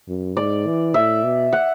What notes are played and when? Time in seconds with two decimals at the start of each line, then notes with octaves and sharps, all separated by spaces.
0.08 F#2
0.37 G#2 D5
0.66 E3
0.94 A2 E5
1.24 B2
1.53 F#5